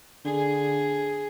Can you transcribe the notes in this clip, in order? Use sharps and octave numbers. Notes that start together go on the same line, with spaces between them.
D3 G#4